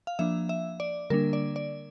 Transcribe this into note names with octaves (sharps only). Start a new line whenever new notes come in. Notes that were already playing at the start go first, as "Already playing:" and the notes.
F5
F3 A#3 D4 E5
E5
D5
D3 G3 A#3 D4 A#4
D5
D5